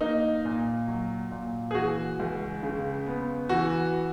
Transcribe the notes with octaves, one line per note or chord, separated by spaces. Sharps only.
A#3 D#4
A#2
F#3
A#2
G#4
E3 F#4
C#2
C#3
B3
E3 F#4